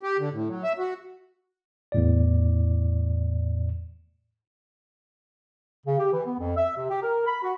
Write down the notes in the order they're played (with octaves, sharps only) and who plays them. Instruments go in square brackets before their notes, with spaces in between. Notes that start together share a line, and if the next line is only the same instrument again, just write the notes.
[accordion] G4
D3
A2
F#3
E5
F#4
[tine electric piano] E2 A2 D5
[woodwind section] C#3
G4
E3
B3
F2
E5
C3
G4
A#4
B5
F#4